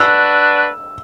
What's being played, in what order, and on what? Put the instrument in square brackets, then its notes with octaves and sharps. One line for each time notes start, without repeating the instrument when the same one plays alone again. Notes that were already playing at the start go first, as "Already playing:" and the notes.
Already playing: [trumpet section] D4 F#4 B4 [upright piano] E6